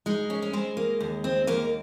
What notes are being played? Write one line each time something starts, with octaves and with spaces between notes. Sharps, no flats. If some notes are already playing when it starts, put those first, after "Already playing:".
G#3 D#4
C#4
C#4
G#3 C4
A#3
D#2
C4
D#2 A#3